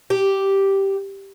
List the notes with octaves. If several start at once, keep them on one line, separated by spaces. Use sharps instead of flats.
G4